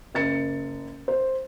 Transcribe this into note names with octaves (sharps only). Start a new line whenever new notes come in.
F#1 A6 C#7
C5